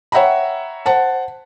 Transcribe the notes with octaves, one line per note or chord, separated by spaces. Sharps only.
C#5 E5 F#5 G5 A#5 B5
C5 F#5 A5